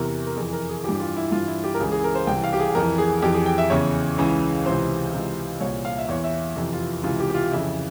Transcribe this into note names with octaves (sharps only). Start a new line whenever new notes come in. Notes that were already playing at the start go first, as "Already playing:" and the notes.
Already playing: E2 C3 E3 A#4
A#4
F2 E3 G#4
A#4
G#4
G2 E3 G4
G4
F4
E4
G2 E3 F4
E4
G4
A#4
C#2 C#3 E3 G#4
G#4
A#4
C5
C2 C3 E3 G5
F5
G4
G#4
F2 E3 A#4
G#4
F2 E3 G4
G#4
G5
E5
E2 C#3 E3 C#5
C#2 C#3 E3
C#2 C3 E3 C5
C#2 C3 E3
C2 A#2 C#5
F5
E5
E2 E3 C#5
E5
F2 C3 E3
F4
E4
C#2 C3 E3 F4
G4
G4
F4
F2 C#3 E3 E4